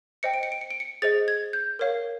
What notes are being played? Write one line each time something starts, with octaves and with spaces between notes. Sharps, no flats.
C5 D#5 G5 C#7
D7
C#7
D7
C#7
D7
C#7
G#4 C5 D#5 A6
G#6
G6
A#4 C#5 F5